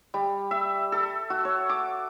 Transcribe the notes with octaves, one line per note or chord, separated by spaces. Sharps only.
G3
E5
A4
F#4
C#5
D6